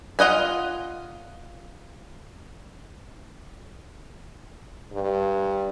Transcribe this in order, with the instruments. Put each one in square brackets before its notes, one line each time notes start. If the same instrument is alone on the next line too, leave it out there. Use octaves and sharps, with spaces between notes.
[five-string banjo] F4 D#5 F#5 G#5
[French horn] G2